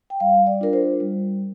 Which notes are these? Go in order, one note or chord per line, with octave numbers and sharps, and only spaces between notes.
G5
G3 F5
D5
D4 F4 A#4
C5
G3